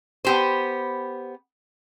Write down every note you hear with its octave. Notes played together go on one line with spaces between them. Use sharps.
B3 G4 C5